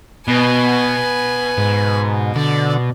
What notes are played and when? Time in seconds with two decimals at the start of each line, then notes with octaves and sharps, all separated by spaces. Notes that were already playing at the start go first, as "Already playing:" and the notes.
0.28 B2 B4 G#5
1.58 G#2
2.36 D3 D5